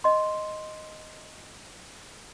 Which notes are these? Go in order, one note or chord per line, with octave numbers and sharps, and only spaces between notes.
D#5 C6